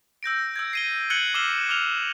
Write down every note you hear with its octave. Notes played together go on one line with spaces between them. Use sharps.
E6 G6 A#6 D7
E6 G6 G#6
C7 D#7 G7
F#6 G#6 C#7 D#7 F#7 G7
D6 E6 F6 C7 E7 G7
D6 F6 F7 G7